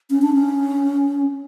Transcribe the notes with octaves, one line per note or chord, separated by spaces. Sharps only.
C#4
D4
C#4